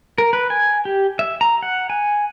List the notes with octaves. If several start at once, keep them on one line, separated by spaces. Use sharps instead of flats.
A#4
B4
G#5
G4
E5
A#5
F#5
G#5